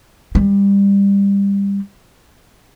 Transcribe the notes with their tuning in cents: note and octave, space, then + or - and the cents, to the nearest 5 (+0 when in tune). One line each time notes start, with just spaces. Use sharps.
G3 +25